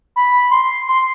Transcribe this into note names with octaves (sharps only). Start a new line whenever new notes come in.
B5
C6
C6